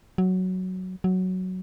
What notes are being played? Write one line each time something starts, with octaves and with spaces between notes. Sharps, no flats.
F#3
F#3